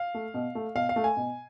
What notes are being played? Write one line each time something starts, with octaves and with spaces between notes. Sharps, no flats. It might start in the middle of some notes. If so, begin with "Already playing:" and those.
Already playing: F5
A3
B2
A3
B2 F5
F5
A3
G#5
B2